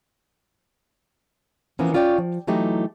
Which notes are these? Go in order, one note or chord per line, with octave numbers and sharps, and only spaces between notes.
E3 F3 A#3 B3 C#4
C#4 F4 C#5 D5 F#5 G5
F3
E3 F#3 A3 D#4 G4